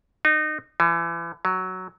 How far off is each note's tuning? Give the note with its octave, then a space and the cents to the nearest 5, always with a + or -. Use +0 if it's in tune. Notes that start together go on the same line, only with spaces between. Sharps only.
D#4 -25
E3 +35
F#3 +5